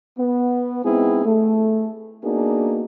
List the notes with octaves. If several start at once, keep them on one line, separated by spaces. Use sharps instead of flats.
B3
G#3 B3 C4 D#4 E4 G#4
A3
A#3 B3 D4 D#4 F#4 G#4